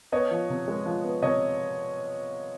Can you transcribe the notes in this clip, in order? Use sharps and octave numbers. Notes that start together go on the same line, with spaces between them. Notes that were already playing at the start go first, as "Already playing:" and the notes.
B3 C#5 D#5
F3
C3
G#3
F3
B3
C3 C#5 D#5